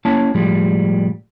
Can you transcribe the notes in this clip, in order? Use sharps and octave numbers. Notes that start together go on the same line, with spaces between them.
A#3 C#4 E4 C#5 A5
A2 F3 G3 G#3